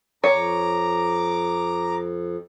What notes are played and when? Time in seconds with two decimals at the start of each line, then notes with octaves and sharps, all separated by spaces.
0.24 F2 C#5 A#5 D6